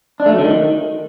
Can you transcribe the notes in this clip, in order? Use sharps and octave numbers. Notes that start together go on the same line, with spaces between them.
D4
A3
F#3
D3
D#3